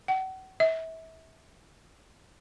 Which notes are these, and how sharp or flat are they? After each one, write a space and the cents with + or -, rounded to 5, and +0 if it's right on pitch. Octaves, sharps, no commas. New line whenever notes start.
F#5 +40
E5 -30